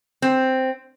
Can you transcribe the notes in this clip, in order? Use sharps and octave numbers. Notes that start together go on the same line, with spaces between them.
C4